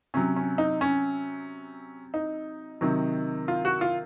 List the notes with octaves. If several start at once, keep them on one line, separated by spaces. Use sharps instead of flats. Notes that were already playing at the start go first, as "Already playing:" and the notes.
C3 F#3 C#4
C#4
D#4
C#4
D#4
C3 D#3 F#3
F4
F#4
F4